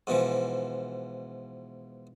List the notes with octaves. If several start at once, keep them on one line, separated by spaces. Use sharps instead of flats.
G#2 B2 E3 F3